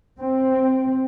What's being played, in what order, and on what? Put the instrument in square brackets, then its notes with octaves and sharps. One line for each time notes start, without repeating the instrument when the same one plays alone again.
[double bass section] C4